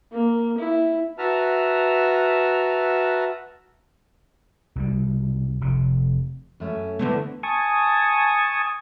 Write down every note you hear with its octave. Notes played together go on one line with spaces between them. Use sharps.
A#3
E4
F#4 B4 E5 A5 A#5 F6
C2 B2 G3
F1 C3
F#2 A3 C#4
D3 E3 A3 B3
G#5 A5 C#6 D#6